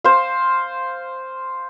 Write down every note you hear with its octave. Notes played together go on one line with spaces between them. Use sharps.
C5 F5